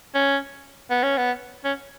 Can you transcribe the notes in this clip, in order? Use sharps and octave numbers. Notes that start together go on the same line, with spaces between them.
C#4
B3
C#4
B3
C#4